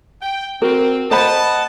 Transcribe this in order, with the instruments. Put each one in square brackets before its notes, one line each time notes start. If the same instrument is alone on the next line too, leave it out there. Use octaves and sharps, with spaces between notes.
[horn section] G5
[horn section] C4 [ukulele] F#4 A#4
[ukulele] C5 B5 [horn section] D#5 F#5 A5